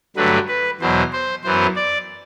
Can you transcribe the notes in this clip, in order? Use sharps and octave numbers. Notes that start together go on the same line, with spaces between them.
G2 D3 F#3 A3 B4
B4
E2 B2 F#3 C5
C5
F#2 E3 B3 C5
D5